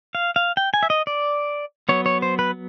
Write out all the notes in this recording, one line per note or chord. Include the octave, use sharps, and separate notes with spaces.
F5
F5
G5
G#5
E5
D#5
D5
F#3 B3 C#5
C#5
C5
B4